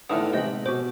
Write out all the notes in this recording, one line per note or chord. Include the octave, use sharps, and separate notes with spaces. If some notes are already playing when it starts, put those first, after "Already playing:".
E2 A2 D3 D#4 B4 D#6 F6
C3 G#3 G4 C5 D#5 G5 B5
B2 F#4 C5 D6